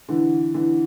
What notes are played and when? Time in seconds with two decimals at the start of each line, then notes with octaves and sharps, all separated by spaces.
0.08 D3 E3
0.54 D3 E3